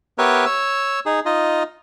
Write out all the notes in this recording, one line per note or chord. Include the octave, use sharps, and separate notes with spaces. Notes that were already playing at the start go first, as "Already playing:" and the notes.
B3 G4 A#4 B4 C#5 E5
C#5 E6
D#4 G#4
D#4 F4 D#5